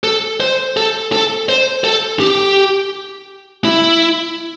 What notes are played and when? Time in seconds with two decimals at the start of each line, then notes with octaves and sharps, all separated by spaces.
0.04 A4
0.40 C5
0.77 A4
1.12 A4
1.49 C5
1.84 A4
2.20 G4
3.65 E4